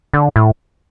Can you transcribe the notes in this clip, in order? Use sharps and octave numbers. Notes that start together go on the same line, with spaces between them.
D3
A2